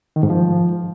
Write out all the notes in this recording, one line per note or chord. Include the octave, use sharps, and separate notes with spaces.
D#3
G#2
F3